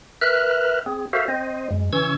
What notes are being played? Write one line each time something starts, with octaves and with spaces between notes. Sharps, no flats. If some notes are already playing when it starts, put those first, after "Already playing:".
A#4 B4 E5 F6 F#6
C4 G#4
F#4 A4 A#4 C5 E5 F5
C4 C5 D#5
F#2 G#3
C#3 E3 C#4 C#6 E6 G#6